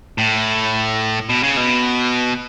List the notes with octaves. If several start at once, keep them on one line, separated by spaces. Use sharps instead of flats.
A2
B2
C#3
B2